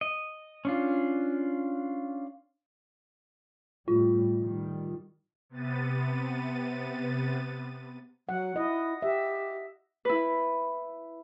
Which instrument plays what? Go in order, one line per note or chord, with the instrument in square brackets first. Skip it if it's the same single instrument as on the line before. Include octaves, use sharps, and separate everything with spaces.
[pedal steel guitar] D#5
C#4 D4 F4
[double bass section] A2 G3 [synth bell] F4
[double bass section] D#3 G3
[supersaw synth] C3 B3 A6 D#7
[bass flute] F#3 [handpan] F#5
[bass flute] E4 [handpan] D#5
[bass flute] G4 [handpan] E5
[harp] E4 B4